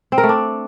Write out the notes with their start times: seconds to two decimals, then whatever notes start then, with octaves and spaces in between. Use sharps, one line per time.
0.12 C4
0.18 A#4
0.23 A3
0.29 D4